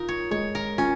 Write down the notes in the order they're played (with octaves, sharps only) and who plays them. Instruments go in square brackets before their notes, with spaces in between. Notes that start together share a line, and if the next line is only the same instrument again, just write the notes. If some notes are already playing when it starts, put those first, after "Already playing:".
Already playing: [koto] D#4 A#4 [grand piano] F4
[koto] C#5
[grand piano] G#3 [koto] C#5
[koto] A#4
[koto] C#4 [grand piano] F4